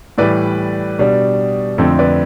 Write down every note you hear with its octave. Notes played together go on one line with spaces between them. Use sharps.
A2 E3 G3 B4 D5
B2 G3 D4
F2 D3 A3 C4 A4 C5
B4 D5